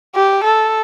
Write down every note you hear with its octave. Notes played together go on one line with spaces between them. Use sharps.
G4
A4